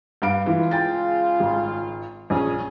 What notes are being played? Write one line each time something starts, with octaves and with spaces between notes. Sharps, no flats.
G2 F5 D7
C#3 E3 G#3 F4
G5 A6
G#1
A#1 C#4 G#4